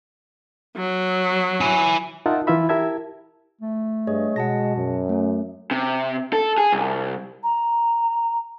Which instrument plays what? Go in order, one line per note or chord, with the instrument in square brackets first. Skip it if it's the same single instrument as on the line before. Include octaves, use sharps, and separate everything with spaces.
[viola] F#3
[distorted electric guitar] E4 G#5
[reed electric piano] D#4 F4 A#4 E5 F#5 A5
E3 E4 F4 E5 B5
E4 G4 A#4 E5 A5 G#6
[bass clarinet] A3
[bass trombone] G2 [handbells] G#4 C#5 D#5
[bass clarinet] B2 [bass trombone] G#3 [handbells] F#5 A5 A#6
[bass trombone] F#2
[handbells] A3 C#4
[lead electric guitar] C3
A4
G#4
C2
[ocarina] A#5